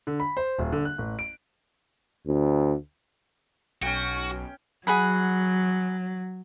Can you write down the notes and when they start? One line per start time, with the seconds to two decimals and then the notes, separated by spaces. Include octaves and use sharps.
0.07 D3
0.20 B5
0.37 C5
0.59 D#1
0.72 D3
0.85 F#6
0.98 A1
1.19 D7
2.27 D2
3.82 B1 C#4 F#4 G5
4.87 F#3 G#4 F#5 B5